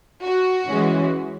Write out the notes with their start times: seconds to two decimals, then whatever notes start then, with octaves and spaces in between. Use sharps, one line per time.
0.23 F#4
0.69 E3 G#3 C#4